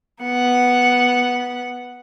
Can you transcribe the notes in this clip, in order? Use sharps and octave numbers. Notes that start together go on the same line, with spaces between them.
B3 F#5